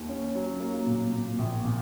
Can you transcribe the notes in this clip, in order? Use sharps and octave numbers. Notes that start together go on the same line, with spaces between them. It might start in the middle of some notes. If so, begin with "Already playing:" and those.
Already playing: D#2
C#4
F#3
A#3
A#2
A#2
A#1
A#2